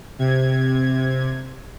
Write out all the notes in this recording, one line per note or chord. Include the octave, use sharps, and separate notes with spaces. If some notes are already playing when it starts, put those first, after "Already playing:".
C3 G#6